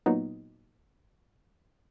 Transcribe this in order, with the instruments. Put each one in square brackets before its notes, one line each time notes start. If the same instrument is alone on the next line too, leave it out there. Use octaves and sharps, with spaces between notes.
[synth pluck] A#2 F#3 B3 D#4